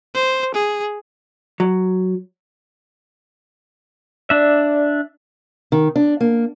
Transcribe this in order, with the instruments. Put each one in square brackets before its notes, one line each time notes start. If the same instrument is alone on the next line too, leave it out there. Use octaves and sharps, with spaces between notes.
[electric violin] C5
G#4
[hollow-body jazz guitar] F#3
[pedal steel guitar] D4 E5 [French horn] D5
[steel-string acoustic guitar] D#3
D4
A#3